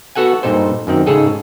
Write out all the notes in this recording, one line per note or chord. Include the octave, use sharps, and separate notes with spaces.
B3 F#4 A4 F#5 G#5
G2 A#2 D#4 A4 C5
F#2 D#3 C4
G#2 C#3 G#4 A4 D#5